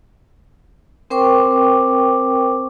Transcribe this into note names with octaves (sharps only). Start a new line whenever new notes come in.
C4 A#4 C5 G5 C#6 D6